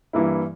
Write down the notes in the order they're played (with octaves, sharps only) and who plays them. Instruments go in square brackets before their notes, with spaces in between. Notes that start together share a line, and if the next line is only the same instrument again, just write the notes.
[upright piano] G2 E3 A#3 E4